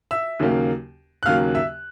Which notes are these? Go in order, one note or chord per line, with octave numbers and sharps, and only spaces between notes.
E5 E6
D#2 C#3 F#3 A#3
F#6
D#2 C#3 F#3 A#3 F5 F6
E5 E6